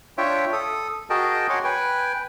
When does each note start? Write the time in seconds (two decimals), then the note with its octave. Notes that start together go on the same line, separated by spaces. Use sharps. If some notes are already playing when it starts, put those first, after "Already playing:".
0.18 D4 F4 C#5 E5 G5
0.53 A4 D#6
1.10 F#4 G#4 A#4 D#5 G5 A5
1.50 C#5 F#5 G#5 C6 D6
1.64 B4 G5 G#5